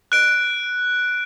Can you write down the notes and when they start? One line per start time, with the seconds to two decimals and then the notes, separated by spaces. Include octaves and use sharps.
0.12 F#6 D7